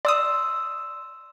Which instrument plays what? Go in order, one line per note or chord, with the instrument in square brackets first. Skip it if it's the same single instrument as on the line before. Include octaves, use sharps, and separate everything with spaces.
[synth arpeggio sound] D5 D#6 [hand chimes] C6 E6